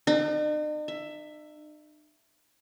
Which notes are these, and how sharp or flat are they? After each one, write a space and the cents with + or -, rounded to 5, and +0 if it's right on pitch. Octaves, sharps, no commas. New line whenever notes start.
D#4 -45
E5 +10